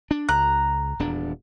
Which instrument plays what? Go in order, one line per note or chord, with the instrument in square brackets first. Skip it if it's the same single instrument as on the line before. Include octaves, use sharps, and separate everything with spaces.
[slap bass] D4
[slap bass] C#2 [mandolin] A#5 F#6
[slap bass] D#1 E2 D4